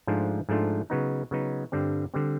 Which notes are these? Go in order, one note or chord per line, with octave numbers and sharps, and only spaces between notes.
G#2 F3 A3 D4 F4
G#2 F3 A3 D4 F4
C#3 F#3 B3 D#4
C#3 F#3 B3 D#4
G2 D3 G3 C4
D3 G3 C4